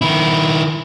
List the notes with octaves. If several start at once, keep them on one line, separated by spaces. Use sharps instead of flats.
D#3 E4